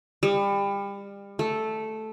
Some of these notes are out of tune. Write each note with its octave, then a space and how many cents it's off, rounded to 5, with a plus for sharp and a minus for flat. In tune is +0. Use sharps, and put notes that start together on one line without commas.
G3 +30
A3 -5